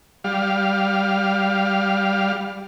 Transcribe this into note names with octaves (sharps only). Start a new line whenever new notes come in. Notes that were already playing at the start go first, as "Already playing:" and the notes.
G3 F5